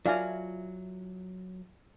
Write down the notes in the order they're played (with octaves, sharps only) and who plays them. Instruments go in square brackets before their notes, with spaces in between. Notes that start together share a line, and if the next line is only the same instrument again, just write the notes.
[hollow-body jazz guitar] F#3 [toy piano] F4 E5 [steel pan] D5 F5 G#5